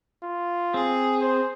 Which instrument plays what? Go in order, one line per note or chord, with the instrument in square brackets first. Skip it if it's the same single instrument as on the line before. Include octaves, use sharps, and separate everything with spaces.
[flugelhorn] F4
[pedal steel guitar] C4 [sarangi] G#4
[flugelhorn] C5